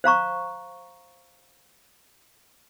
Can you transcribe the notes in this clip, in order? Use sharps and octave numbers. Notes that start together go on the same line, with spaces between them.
C5 F5 A#5 C#6